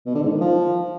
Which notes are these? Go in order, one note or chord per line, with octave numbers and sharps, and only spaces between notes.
B2
D3
G#2
D#3
F3